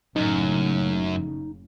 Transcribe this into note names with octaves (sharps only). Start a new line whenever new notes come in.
F#1 F#2 A2 C#3 D#4